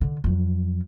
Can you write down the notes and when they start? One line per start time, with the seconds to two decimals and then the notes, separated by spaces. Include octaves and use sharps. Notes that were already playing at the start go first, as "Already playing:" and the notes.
0.01 D3
0.24 F2 F#3